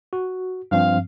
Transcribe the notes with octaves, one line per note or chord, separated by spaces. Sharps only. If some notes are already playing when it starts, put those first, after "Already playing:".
F#4
G2 F3 C4 F5